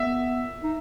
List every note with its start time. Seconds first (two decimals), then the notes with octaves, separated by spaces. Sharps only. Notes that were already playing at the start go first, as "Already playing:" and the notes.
Already playing: B3 E5
0.63 D#4